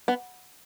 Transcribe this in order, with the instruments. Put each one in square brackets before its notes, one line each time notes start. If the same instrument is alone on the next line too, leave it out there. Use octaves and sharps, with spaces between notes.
[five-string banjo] B3